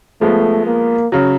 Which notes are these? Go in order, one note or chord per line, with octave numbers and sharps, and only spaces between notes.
F3 G#3 A3 B3
A#3
C#3 F#3